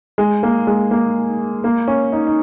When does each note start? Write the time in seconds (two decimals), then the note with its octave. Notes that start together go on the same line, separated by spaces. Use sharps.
0.18 G#3
0.43 A#3
0.67 G#3
0.91 A#3
1.64 A#3
1.88 C#4
2.12 D#4
2.27 D#4